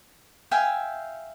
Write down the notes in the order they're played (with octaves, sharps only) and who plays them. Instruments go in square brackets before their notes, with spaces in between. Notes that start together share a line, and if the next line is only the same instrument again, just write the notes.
[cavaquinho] E5 F5 G5 G#5